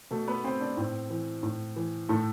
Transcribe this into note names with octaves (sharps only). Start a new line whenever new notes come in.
B2 A3 A4
B3 B4
C4 C5
D4 D5
A2 C4 C5
E3
A2
E3
A2 A3 A4